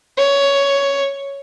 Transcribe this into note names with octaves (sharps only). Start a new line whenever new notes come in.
C#5